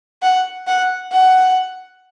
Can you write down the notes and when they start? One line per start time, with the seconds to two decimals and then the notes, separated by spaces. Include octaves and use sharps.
0.22 F#5
0.67 F#5
1.11 F#5